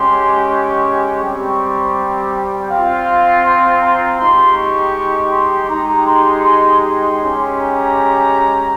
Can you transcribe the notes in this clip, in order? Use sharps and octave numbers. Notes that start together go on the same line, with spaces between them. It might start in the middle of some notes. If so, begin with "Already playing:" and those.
Already playing: G#3 C#4 G4 C6
C#6
G3 C4 G4 C#6
G5
C4 F4 F5
C6
A#5
G#3 D#4 G4 C6
C#6
C6
G#3 D#4 G4 A#5
C6
C6
C6
G#3 C#4 G4
A#5